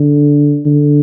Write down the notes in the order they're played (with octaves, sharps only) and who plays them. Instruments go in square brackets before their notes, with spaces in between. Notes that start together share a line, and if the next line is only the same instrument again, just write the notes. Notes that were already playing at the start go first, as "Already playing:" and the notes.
Already playing: [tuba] D3
D3